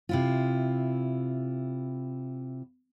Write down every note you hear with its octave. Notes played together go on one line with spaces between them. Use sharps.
C3 E4 F4